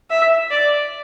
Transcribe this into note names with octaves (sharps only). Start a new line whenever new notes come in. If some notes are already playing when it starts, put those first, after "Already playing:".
E5
D5